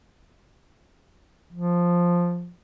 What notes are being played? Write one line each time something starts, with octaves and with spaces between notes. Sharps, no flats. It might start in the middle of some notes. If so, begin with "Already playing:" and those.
F3